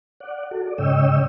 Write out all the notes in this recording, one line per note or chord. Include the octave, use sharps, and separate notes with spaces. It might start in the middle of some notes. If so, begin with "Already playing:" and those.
D5 F#5
F#4 A4
D5
G#2 C#3 C#5 D#5 G5 E6